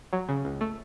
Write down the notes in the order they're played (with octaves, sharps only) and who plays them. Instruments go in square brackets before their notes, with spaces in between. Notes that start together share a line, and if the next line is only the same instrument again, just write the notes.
[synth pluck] F#3
C#3
C#2
A3